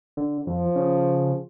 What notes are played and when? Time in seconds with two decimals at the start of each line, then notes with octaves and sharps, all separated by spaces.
0.17 D3
0.47 F2 F3
0.76 C#3